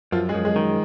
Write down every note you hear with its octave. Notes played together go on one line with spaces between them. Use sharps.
F#2 F3 F4
G#3 G#4
F#2
G#3 G#4
D#3